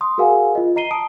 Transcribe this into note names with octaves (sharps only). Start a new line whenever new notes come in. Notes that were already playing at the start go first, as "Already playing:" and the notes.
C6 D#6
F#4 G#4 A#4 F5 F#5 G#5
F4 D#5
D#5 A#5 C7 D#7 G7
A5 D#6 D7